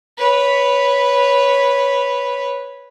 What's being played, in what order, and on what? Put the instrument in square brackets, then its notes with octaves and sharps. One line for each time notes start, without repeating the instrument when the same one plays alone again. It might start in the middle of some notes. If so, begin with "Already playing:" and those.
[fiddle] B4 C#5